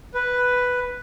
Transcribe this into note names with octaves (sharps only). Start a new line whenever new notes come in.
B4